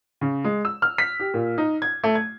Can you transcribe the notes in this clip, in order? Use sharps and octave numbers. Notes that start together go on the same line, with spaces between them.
C#3
G#3
E6
F6
B6
G4
A#2
D#4
G#6
A3
G#6